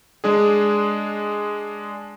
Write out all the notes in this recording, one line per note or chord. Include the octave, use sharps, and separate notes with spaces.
G#3 D4 G#4